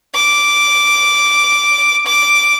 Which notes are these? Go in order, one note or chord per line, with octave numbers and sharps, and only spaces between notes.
D6
D6